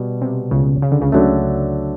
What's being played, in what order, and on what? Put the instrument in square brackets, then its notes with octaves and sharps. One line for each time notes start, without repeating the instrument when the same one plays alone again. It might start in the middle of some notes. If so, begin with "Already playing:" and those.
Already playing: [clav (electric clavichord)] B2 G3 B3
[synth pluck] C3
C#2 C#3
C#3
D3
C#2 C#3
[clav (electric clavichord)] D3 F#3 A3